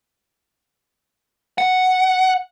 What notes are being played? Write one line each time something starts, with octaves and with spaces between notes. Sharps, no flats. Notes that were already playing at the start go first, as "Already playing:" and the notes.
F#5